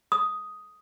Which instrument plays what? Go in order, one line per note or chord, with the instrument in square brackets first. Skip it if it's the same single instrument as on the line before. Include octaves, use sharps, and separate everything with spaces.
[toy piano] D#6